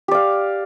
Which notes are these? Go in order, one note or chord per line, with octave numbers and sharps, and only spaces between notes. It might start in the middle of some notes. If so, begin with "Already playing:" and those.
G4 D5 F5